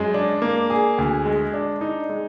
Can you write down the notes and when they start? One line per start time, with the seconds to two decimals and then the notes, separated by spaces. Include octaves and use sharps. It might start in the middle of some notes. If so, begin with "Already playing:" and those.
Already playing: F#2 G#3
0.14 D4
0.42 A#3
0.70 G#4
0.98 D2
1.25 G#3
1.54 D4
1.81 D#4
2.09 G#3